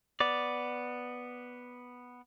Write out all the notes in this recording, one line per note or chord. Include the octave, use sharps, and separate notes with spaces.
B3 D5